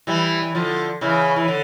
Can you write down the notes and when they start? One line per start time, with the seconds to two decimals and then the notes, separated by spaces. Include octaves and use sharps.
0.07 E3 G3
0.42 E3
0.55 D3 F3
1.01 C#3 E3
1.36 E3
1.48 D3